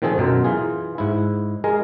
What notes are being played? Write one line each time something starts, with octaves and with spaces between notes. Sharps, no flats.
A#2 D#3 F3 C4 G#4 A4
F#2 B2 A#4 C5
E3 F4 G#4
G#2 E4
G#3 G#4 A#4 D#5